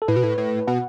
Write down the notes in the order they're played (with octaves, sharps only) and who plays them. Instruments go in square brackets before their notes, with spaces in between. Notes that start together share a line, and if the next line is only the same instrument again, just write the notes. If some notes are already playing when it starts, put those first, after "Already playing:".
[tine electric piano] A4
[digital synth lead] A2 [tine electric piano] B4
[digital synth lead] B2
A2
A2
[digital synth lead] B2 [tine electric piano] F#5